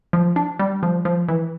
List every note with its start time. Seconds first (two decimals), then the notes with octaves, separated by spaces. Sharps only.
0.13 F3
0.36 D4
0.59 G3
0.83 F3
1.05 F3
1.28 E3